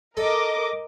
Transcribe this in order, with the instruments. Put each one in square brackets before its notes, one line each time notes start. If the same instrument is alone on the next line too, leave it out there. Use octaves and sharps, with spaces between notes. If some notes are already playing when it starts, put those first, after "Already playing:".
[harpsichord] A4 [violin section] A#4 D#5 D6